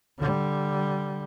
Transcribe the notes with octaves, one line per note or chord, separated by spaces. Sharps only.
D3 G3